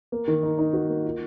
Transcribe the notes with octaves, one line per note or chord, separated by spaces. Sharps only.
A#3
D#3
D#4
D#4
F#4
A#3
F4